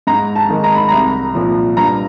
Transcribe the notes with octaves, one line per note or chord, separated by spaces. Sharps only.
G#2 A#5
A5
D#3 G#3
A#5
B5
C2 A#5
A#2 F3
G2 A#5